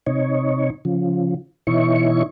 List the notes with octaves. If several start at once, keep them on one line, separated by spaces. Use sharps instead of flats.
C3 D#4 C#5
C#3 F3
B2 E3 D#4 E4 C#5 C#6